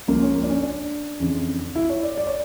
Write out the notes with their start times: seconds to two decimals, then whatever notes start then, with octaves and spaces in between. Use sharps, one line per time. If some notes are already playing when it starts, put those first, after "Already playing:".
0.08 C#2 C#3 F3 A#3
0.22 C#4
0.36 A#3
0.43 D4
0.49 C#4
0.63 D4
1.20 F2 C#3 E3
1.76 E4
1.90 C#5
2.03 D5
2.17 D5
2.27 C#5